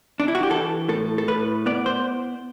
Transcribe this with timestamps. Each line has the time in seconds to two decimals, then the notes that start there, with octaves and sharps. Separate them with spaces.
0.20 D4
0.28 E4
0.35 F#4
0.43 G4
0.50 E3 A4
0.89 A2 A4
1.18 A4
1.28 A2 B4
1.66 B3 D5
1.86 C5